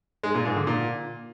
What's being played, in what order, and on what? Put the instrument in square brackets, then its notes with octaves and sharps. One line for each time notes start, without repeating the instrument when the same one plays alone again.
[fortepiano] G#3
A#2
G#2
D3
A#2